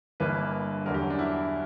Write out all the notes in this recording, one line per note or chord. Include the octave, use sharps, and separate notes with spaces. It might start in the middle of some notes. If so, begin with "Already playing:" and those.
G1 G2 E3 A#3 B4
E2 D3 F#3 A#4
G4
C#4
D4
E4